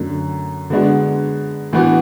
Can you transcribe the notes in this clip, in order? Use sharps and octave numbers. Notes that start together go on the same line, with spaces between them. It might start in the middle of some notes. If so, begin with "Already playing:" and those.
Already playing: F#2 D3 A3
D3 G#3 B3 D4 F#4
A2 E3 B3 F#4